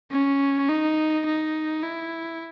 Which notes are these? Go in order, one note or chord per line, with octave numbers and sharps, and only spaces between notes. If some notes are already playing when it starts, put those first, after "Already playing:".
C#4
D#4
D#4
E4